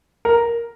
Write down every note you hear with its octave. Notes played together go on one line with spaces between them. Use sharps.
A#4